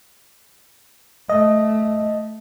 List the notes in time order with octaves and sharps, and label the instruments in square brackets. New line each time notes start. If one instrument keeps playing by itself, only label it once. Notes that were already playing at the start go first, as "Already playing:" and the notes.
[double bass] A3 [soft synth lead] D#5